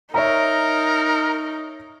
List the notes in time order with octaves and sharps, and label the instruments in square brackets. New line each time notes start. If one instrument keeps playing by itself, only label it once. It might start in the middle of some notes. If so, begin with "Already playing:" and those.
[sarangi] D#4 [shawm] A#4 [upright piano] C#5 E5 A#5